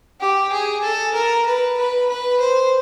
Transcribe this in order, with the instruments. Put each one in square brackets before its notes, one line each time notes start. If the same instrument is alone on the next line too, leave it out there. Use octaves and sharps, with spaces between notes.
[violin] G4
G#4
A4
A#4
B4
B4
B4
C5